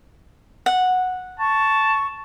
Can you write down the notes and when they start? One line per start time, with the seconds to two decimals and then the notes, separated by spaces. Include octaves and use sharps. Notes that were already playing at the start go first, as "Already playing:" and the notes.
0.66 F#5
1.40 A5 C#6